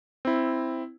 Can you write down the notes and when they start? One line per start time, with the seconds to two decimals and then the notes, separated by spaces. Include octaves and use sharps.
0.25 C4 E4